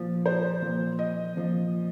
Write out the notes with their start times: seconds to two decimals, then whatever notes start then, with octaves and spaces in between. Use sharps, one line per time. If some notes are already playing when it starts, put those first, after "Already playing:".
Already playing: A#2 F3
0.26 C5
0.62 A#2 F3
0.99 D#5
1.35 A#2 F3